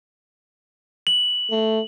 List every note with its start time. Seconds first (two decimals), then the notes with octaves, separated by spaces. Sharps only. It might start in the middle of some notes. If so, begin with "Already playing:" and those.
1.07 F#7
1.51 A3